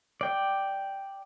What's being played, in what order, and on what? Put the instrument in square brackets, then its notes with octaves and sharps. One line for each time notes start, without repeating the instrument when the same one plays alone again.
[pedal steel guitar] D5 G5